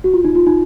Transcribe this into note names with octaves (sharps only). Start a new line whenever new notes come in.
F#4
F4
D#4
F4
D#4